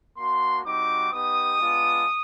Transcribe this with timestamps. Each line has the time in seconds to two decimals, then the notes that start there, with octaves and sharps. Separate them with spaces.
0.17 A#3 D4 F#4 C6
0.64 G3 C4 D#4 F#4 D6
1.11 B3 D#4 G4 D#6
1.59 G#3 B3 D4 F4